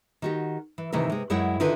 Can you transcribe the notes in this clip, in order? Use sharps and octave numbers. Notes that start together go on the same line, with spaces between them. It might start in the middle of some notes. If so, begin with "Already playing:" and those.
D#3 F#4 G4
E3
C3 D#3 E3 A3 E4 A#4
C3 G#3
F#2 G#3 E4 C#5 F#5 G5
D3 D#3 E4 F4 B4